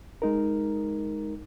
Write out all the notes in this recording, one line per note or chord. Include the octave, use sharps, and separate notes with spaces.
G#3 D#4 A#4